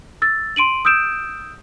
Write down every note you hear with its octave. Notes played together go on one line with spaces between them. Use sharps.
E6 A6
C6 D7 D#7 F#7
D#6 E6 G6 D7 E7